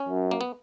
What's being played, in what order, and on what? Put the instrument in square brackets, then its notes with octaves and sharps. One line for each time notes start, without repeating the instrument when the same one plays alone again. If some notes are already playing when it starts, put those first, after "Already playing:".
Already playing: [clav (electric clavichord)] C#4
[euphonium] F#2
[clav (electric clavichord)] A#3
B3